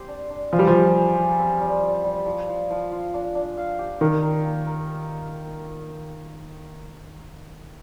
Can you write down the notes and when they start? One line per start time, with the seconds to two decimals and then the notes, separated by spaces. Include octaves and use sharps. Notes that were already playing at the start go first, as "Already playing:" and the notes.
Already playing: C4 G4 C5
0.08 D4
0.30 D4
0.52 F3 G#4
0.59 G3
0.67 F3
0.74 F4
0.96 G#4
1.17 F4
1.39 C4
1.61 G3
1.83 G3
2.04 G3
2.26 F3
2.48 F3
2.70 F3
2.91 F4
3.14 D4
3.35 D4
3.58 F5
3.79 G4
4.01 D#3 A#4
4.22 A#4
4.45 A#3
4.67 A#4